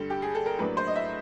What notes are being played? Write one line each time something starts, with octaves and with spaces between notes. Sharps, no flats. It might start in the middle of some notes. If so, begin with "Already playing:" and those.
Already playing: G2 D3 G3 A4
G4
G#4
A4
A#4
A2 F#3 A#3 D4 B4
C5
D#5
E5